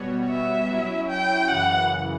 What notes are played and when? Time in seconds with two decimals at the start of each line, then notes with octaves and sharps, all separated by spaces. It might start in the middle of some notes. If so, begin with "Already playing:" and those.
Already playing: B2 G3 B3 F#4 C#5
0.28 E5
0.69 F#3 C#4 E4
1.09 G5
1.48 F#2 C#3 E3 F#5